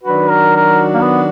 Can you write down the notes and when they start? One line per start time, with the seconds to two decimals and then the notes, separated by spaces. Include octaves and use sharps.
0.03 D#3 F#3 D4 F#4 B4
0.29 A#4
0.56 A#4
0.94 A#3
1.01 B3